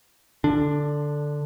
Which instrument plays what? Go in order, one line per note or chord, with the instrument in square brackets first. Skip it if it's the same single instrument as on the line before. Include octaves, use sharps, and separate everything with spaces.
[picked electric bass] D3 D4